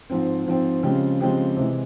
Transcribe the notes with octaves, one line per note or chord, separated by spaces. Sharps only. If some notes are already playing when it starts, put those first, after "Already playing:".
G#2 F3 C4
G#2 F3 C4
C#3 F3 G#3 C4 G4
C#3 F3 G#3 C4 G4
C3 E3 G#3